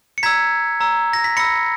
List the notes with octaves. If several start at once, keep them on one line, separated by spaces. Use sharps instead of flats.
C#7
A#5 E6 G#6 B6
A#5 E6
A#6
B6
B5 E6 A#6 C#7